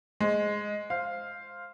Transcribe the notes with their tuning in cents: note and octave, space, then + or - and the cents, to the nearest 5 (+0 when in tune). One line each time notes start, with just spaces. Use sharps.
G#3 +0 C5 +0
C5 +0 F5 +0